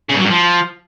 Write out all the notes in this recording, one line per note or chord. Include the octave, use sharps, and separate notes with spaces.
C#3
G2
F#3
G2
F3